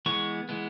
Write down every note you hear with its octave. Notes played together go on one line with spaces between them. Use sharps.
E3 G#3 B3 C#6
E3 G#3 B3